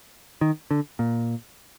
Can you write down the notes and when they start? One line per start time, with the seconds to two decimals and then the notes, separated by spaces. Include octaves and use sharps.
0.41 D#3
0.71 D3
0.99 A#2